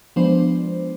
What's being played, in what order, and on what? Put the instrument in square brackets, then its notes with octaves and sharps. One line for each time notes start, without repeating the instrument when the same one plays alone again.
[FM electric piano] F3 G#3 B3 D4 C5